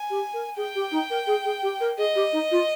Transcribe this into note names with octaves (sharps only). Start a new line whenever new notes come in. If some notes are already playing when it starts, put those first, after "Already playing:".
Already playing: G#5
G4
A#4
G#4 G5
G4
D#4
A#4
G#4
G#4
G4
A#4
G#4 D#5
G4
D#4
F4